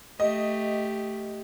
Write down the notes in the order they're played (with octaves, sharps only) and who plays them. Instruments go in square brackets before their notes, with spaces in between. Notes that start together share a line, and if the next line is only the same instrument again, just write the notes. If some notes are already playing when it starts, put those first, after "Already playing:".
[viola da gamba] A3 [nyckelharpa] G4 [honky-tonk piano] D#5